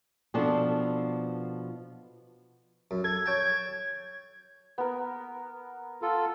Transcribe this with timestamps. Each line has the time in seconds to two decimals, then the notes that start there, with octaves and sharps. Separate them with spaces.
0.34 B2 F3 B3 C4 D4 A4
2.91 F#2
3.04 A4 G#6
3.26 C#5 G5 A5
4.78 B3 A#4
6.02 F4 A4